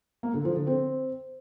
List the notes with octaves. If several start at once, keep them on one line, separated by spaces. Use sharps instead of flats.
A#3
D3
F3
D3
C4